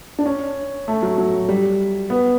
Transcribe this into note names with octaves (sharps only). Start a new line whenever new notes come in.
D4
C#4
A3
F#3
F#3
G3
B3